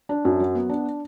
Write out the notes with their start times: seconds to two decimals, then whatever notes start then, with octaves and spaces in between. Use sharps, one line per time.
0.09 D4
0.25 F#2
0.40 F#3
0.55 B3
0.69 D4